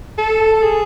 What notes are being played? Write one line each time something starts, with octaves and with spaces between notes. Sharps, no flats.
A4
A4
G#4